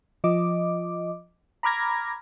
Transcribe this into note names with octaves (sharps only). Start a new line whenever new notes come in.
F3 D#5 D6
A#5 B5 D6 F6 G#6 A#6